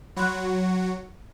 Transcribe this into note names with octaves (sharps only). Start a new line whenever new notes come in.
F#3 F#4 B5 C6 F#6